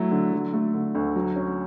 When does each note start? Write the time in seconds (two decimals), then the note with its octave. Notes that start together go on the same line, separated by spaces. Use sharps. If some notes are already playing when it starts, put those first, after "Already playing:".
Already playing: F#3 A3 E4
0.12 D3
0.33 F#3
0.54 A3
0.74 D3
0.95 D2
1.16 F#3
1.36 C#4